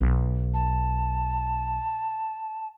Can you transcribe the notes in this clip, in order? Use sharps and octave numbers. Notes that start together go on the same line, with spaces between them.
B1
A5